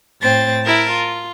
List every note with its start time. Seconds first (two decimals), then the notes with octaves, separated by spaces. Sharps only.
0.21 A2 C4 A6
0.63 E4 A#4 A5
0.92 F4